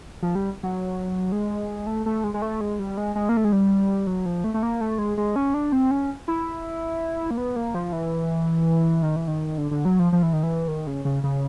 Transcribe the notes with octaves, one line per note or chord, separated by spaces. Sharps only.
F3
G3
F#3
G#3
A3
A3
G#3
G#3
A3
G#3
G3
G#3
G#3
A#3
A3
G#3
G3
F#3
F3
A3
A3
A#3
A3
G#3
G#3
C#4
D4
C4
C#4
E4
A#3
B3
A#3
F3
E3
D#3
E3
D#3
D3
D3
F#3
F3
F3
E3
D#3
E3
D#3
C#3
C#3
C#3